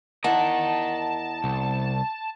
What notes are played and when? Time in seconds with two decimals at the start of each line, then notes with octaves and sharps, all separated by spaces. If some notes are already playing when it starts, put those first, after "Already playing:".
0.24 E2 A#4 D#5 F#5 A5
1.44 C2